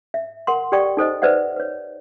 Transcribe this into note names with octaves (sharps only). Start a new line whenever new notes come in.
E5
A#4 F#5 C6
G4 A4 D5 G5 C#6
D#4 A4 C5 D#5
B4 C5 D5 E5 F#5
B4 C#5